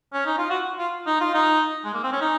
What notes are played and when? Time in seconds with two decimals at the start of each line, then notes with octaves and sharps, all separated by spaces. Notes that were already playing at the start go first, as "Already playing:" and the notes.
0.13 C#4
0.26 D#4
0.38 F4
0.50 F#4
0.79 F4
1.07 D#4
1.21 F4
1.34 D#4
1.84 G#3
1.94 A#3
2.03 C4
2.13 C#4
2.21 D#4